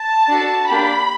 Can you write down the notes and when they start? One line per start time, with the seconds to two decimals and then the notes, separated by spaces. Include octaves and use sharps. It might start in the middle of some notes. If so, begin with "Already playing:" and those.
Already playing: A5
0.28 D4 F#4 A4
0.68 A#3 D4 G4 B5